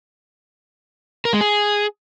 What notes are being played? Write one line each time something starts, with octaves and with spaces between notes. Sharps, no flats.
A#4
G#3
G#4